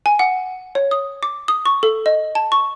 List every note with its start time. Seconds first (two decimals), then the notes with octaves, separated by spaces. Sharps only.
0.06 G#5
0.19 F#5
0.75 C#5
0.91 D#6
1.23 D6
1.48 D#6
1.66 C#6
1.83 A4
2.06 D#5
2.35 A5
2.52 C#6